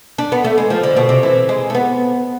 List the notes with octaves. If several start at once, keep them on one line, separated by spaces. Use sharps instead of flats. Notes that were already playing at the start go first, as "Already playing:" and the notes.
D4
B3
A3
G#3
F3
D3
B2
C3
E3
G#3
A3
B3